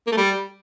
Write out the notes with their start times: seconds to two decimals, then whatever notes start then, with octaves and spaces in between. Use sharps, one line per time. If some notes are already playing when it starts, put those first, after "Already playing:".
0.07 A#3
0.12 A3
0.17 G3